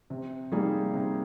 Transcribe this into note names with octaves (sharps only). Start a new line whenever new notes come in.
C3
G3 A#3 D#4 G#4
C3